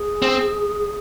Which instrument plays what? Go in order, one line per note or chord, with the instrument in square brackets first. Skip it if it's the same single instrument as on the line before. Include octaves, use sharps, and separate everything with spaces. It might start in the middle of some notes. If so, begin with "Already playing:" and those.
Already playing: [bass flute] G#4
[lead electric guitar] C4